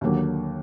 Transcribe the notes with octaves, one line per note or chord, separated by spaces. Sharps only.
D#2 D3 F#3 A#3